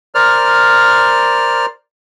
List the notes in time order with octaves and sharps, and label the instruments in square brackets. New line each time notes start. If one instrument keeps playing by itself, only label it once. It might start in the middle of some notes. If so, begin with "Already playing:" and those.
[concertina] A#4 C5 D5 F6